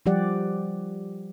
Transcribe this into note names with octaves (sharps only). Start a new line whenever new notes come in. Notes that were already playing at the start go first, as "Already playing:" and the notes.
F3 G3 G4 D5 F#5